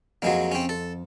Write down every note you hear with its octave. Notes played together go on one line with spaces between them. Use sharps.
F2 F#3 G#3 A#3 C5 D#5 F5 F#5
C4 C#4
A4